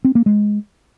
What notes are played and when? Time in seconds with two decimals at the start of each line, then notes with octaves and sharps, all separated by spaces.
0.05 C4
0.15 A#3
0.26 G#3